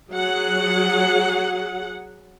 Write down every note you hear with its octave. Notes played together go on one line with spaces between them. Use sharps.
F#3 G#4 F#5